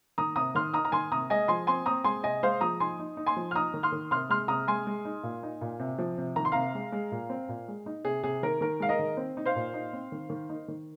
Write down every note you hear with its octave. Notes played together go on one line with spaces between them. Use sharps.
D#3 A#5 D#6
C3 A#5 D#6
D#3 C6 F6
D#4 A#5 D#6
A#5
D#3 G#5 C6
C3 A#5 D#6
G#3 D#5 G#5
F3 G#5 C6
C4 G#5 C6
C4 A#5 D#6
G#3 G#5 C6
C3 D#5 G#5
G#3 C5 F5
F3 A#5 D#6
D#4 G#5 C6
D#4
D#4
G#5 C6
F3
F6
D#4 A#5 D#6
D#3
C6 F6
D#3
C3 C6 F6
G#3 C6 F6
C3 A#5 D#6
G#3 G#5 C6
G#3
D#4
A#2
D#4
A#2
C3
F3
C3
D#3 A#5
C6
C3 F5 A#5
G#3
G#3
A#2
C4
A#2
G#3
D#4
C3 G#4
C3 G#4
D#3 A#4
D#3 A#4
G#3 F5
A#4 D#5
D#3
C4
D#4
C5 F5
A#2
D#4
C4
D#3
D#3
D#4
D#3